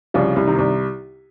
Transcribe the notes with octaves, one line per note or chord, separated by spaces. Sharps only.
C2 C#3 F3
C2
C3 D#3
C2